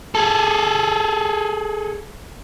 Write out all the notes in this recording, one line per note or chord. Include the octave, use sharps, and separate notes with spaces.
G#4 A4